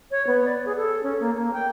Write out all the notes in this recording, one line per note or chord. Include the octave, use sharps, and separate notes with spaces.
C#5
B3
D5
G#4
A4
C#4
A#3
A#3
G5